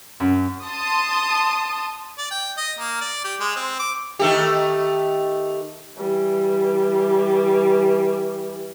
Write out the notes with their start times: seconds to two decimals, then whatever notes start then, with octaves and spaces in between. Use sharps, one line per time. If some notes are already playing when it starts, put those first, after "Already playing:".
0.20 F#2
0.65 A5 C6 D#6
2.18 D5
2.31 G5
2.58 D#5
2.79 A#3
3.01 D5
3.25 G4
3.40 G#3
3.56 C4
3.80 D6
4.19 D#3 A3 G4
5.97 E3 G3